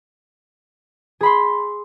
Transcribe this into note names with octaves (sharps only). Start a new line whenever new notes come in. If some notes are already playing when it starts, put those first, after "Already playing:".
G#4 B5 C6